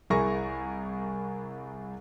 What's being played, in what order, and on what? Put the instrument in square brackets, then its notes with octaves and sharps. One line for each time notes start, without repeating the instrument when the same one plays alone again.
[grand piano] C2 E4 G#4 A#4 C#6 A#6